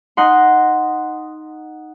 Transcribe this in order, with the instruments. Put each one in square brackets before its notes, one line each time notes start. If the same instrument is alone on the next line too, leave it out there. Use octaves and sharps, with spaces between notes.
[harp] D#4 D#5 F#5 C6